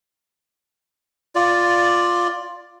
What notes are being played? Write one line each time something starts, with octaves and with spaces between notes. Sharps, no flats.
F4 D5